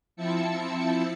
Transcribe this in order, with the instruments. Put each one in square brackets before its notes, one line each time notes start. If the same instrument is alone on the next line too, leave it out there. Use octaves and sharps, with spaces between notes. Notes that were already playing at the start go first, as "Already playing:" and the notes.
[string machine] F3 C4 E4 E5 A5 C#7